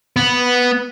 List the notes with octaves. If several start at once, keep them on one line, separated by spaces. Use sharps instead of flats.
B3